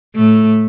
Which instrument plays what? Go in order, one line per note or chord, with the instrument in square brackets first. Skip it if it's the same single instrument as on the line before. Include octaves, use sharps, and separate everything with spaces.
[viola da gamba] A2 A3